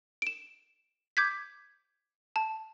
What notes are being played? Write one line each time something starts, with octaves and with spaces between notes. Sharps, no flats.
D7 E7
D6 G6 G#6 B6
A5